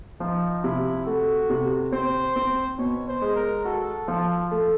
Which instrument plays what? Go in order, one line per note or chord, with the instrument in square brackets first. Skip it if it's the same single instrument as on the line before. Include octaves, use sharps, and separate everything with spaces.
[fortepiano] F3 [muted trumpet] D#4
[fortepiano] C3 [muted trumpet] E4
[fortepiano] A3 [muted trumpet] F#4
[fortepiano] C3
[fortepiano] C4 [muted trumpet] C5
[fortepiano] C4
[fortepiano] B2 [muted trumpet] C#5
[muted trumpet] C5
[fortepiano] G#3
[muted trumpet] A#4
[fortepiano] F#4 [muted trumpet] A4
[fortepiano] F3
A3